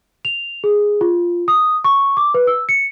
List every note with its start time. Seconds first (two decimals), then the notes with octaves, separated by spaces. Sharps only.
0.25 F7
0.64 G#4
1.01 F4
1.48 D#6
1.84 C#6
2.17 D6
2.34 B4
2.47 E6
2.69 C#7